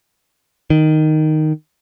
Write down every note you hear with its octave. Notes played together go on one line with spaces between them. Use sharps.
D#3